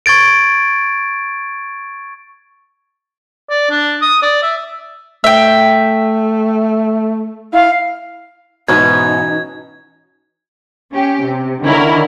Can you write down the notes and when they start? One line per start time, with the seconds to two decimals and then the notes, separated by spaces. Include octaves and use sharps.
0.06 C#6 G#6 A6 D7
3.50 D5
3.71 D4
4.02 D#6
4.22 D5
4.43 E5
5.24 A3 E5 G5
7.53 E4 F5
8.68 G#2 B2 E3 C#4 D#4 F#4 G#6
10.92 C#4 G4
11.23 C3
11.63 D3 D#3 C#4 E4 A#4